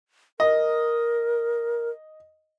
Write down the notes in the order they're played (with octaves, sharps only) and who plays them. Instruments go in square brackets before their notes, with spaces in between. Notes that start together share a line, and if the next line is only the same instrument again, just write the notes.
[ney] A#4 [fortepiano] D#5